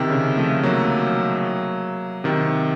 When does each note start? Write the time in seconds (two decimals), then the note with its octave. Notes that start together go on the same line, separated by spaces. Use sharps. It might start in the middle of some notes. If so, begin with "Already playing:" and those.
Already playing: C3 D#3
0.10 C#3
0.37 F3 A3
0.63 F#3 A#3
2.24 C3 D#3